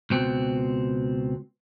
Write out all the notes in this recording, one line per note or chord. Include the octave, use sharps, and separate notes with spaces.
C#2 B2 C4